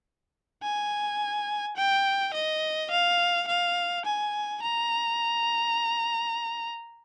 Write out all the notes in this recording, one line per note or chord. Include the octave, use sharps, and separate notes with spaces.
G#5
G5
D#5
F5
F5
G#5
A#5